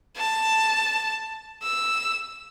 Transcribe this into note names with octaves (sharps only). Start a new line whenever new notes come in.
A5
E6